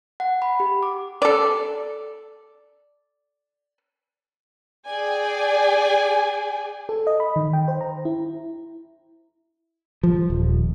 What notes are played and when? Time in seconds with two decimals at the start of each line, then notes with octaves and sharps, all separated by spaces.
0.20 F#5
0.42 B5
0.60 G4
0.83 D6
1.22 A4 D5
4.86 G#4 D5 G5 G#5
6.89 A4
7.07 D#5
7.20 B5
7.36 D#3
7.53 G5
7.68 C5
7.81 A#5
8.05 E4
10.03 F3
10.30 D#1